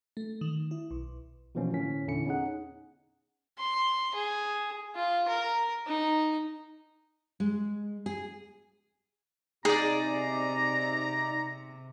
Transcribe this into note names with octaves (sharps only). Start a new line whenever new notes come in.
A3
D#3
E4
B1
B2 E3 F3 A#3 C#4
A2 D3 C#4 B6
E2 A#2 D3 C#4 E4 C#7
B3 C#4 D#4 G#4 F#5
C6
G#4
F4
A#4
D#4
G#3
G#4
C3 D#4 G#4 D5 A#5